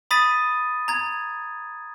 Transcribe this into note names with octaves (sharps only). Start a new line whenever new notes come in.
B5 D#6 A6 B6 D#7
A#5 G#6